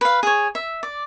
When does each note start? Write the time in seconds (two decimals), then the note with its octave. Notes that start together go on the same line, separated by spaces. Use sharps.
0.01 B4 F5
0.23 G#4 C#5
0.55 E5
0.83 D5